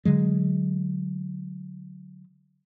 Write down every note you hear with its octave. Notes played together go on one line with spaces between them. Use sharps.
D3 F#3 G#3